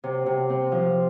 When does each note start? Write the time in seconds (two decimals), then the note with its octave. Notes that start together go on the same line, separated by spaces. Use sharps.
0.04 C3
0.26 C3
0.50 C4
0.72 F3